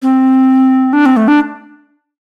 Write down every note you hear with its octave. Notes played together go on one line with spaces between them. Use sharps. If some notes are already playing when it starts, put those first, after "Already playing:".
C4
D4
C4
A3
D4